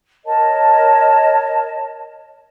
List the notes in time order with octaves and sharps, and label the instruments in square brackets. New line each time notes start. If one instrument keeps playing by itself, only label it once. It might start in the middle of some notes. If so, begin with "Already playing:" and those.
[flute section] A#4 C#5 D#5 A5